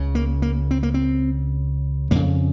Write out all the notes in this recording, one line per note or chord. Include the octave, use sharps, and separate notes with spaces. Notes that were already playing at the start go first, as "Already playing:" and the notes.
Already playing: C#2 C#3
A#3
A#3
C4
A#3
C4
F2 C#3 A#3